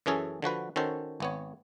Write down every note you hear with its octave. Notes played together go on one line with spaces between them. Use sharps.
F#2 E3 C#4 G#4 A4
D3 F3 F#4 B4
D#3 C#4 F#4 A4 C5
G#1 B3 C#5